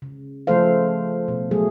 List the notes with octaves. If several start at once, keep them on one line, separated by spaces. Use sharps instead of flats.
C#3
C#3 F3 A3 A4 C5 F5
B2
F#3 A3 G#4